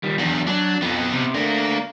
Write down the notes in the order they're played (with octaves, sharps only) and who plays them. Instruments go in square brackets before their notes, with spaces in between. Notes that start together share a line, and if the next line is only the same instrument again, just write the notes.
[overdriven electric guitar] D#3 G3
[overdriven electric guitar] E2 [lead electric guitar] F#3 D4
[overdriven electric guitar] F#3 [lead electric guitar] D4
[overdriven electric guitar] F2 [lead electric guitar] B3 D#4
[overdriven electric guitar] C3
[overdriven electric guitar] A3 D4 [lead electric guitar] A#3 A#4